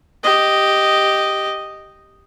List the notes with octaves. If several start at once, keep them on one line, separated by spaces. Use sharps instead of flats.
G4 D#5